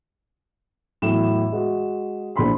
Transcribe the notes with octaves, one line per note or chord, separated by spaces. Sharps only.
E2 A2 F#3 E7
G#3 F#4
A#1 A#2 D4 E4 B5 C6